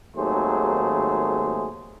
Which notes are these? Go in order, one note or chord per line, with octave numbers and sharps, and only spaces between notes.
G#1 D#2 F#3 A3 G#4 C5